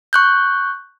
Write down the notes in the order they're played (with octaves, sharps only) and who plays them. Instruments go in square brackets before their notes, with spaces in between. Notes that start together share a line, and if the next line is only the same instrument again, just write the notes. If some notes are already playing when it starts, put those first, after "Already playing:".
[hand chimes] C#6 F#6 G6